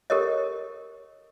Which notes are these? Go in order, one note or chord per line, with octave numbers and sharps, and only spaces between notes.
G4 A4 A#4 C#5 D#5